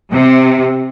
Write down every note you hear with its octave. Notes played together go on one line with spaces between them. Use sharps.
C3